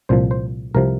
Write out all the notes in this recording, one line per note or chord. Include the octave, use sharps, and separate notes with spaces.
C2 A#2 F3 C5
C5
C2 C3 F3 A#4